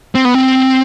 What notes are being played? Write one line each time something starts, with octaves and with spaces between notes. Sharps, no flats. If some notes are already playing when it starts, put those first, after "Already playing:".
C4
B3
C4